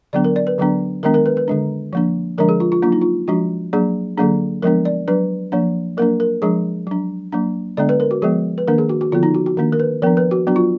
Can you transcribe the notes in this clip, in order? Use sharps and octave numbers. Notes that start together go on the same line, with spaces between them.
D3 F#3 B3 D4 D5
A#4
D5
B4
D3 F#3 B3 D4
D#3 G#3 B3 D4 A#4
A#4
B4
B4
D3 G#3 D4
F3 A#3 D4
D3 F3 G#3 D4 A#4
G#4
F4
F4
F#3 A#3 D4 F4
D#4
F4
F3 G#3 D4 F#4
F#3 A#3 D4 G#4
D3 F#3 A#3 D4 G#4
F3 G#3 B3 D4 A#4
D5
F#3 D4 B4
F3 A#3 D4
F#3 A#3 D4 A#4
A#4
F3 G#3 D4 G#4
F#3 D4
F#3 A#3 D4
D3 G#3 B3 D4 D5
B4
A#4
F#4
F3 G#3 B3 G#4
B4
D#3 A#3 D4 A#4
G#4
F#4
F#4
D3 F3 B3 F4
D#4
F#4
F#4
D#3 A#3 D4
A#4
B4
F3 B3 D4 A#4
B4
F#4
F#3 B3 D4 F#4
F4